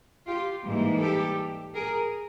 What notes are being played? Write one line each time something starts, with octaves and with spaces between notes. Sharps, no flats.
F4 G4
G#2 E3 G3 A#3
G4 A4
G#4 A#4